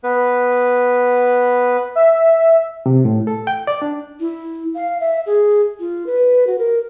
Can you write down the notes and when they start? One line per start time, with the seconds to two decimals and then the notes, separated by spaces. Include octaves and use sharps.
0.04 B3 B4
1.95 E5
2.86 C3
3.05 A2
3.27 A4
3.47 G5
3.67 D5
3.82 D4
4.20 E4
4.76 F5
5.00 E5
5.26 G#4
5.80 F4
6.06 B4
6.47 F#4
6.58 A#4